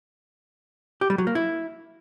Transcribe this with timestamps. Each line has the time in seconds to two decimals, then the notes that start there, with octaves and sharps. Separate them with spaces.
1.01 G4
1.10 G3
1.18 F#3
1.27 A#3
1.35 E4